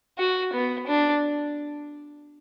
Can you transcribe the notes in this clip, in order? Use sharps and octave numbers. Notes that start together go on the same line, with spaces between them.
F#4
B3
D4